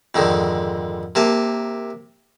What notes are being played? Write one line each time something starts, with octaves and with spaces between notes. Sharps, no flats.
F2 G#2 D3 D#3
C3 A#3 A5